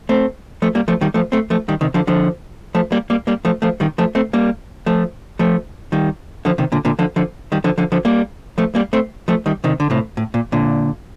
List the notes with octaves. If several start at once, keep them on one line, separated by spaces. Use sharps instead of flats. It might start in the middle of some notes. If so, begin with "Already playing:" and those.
A3 C4
F3 A3
G3 A#3
F3 A3
D#3 G3
F3 A3
A3 C4
F3 A3
D#3 G3
C3 D#3
D3 F3
D3 F3
F3 A3
G3 A#3
G3 A#3
G3 A#3
F3 A3
F3 A3
D#3 G3
F3 A3
A3 C4
G3 A#3
F3 A3
F3 A3
D#3 G3
D3 F3
C3 D#3
A#2 D3
A#2 D3
D3 F3
D3 F3
D#3 G3
D3 F3
D3 F3
D3 F3
G3 A#3
F3 A3
G3 A#3
A3 C4
F3 A3
D#3 G3
C3 D#3
D3
A2 C3
A2
A#2
A#2 D3